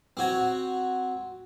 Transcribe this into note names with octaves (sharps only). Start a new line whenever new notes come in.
C4 F#4 C#5